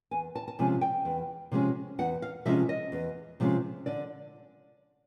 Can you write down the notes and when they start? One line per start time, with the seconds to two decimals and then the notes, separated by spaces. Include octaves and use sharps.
0.11 E2 G#5
0.35 A5
0.48 A5
0.59 C3 F3 G#3 C#4 G#5
0.81 G5
1.05 E2
1.52 C3 F3 G#3 C#4
1.99 E2 F#5
2.22 F5
2.45 C3 F3 G#3 C#4 E5
2.69 D#5
2.92 E2
3.40 C3 F3 G#3 C#4
3.86 D3 D5